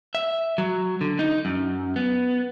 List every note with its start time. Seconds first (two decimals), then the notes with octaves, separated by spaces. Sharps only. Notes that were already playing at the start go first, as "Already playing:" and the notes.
0.15 E5
0.58 F#3
1.01 D3
1.19 D#4
1.45 F#2
1.96 B3